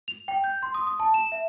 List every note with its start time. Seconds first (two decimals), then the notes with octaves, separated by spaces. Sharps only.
0.08 F7
0.28 G5
0.44 G6
0.63 C6
0.74 D#6
0.87 D#6
1.00 A5
1.14 E7
1.32 E5